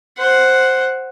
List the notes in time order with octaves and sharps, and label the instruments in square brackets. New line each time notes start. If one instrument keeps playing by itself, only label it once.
[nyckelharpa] C5 F#5